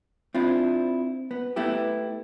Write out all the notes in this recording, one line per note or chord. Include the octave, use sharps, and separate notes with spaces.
C4 D4 E4 F4
B3
A3 B3 E4 G4